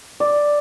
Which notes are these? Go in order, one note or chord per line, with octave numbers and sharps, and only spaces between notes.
D5